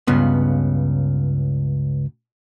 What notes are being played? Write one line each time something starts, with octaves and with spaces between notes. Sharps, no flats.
C#2 G2 C#3 B3